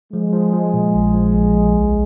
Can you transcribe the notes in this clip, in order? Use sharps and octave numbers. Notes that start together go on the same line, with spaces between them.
F3 G#3
F3
F3
A#2
A#1
F3
A#1
A#1
C#2